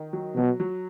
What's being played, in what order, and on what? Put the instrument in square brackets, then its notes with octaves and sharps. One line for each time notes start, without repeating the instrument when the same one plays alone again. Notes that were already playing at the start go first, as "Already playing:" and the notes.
Already playing: [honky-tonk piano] D#3
F#3
[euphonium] B2 [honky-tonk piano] F#3
[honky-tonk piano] F#3